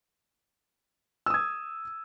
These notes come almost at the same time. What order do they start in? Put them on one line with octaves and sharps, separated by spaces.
E6 D#6 G#6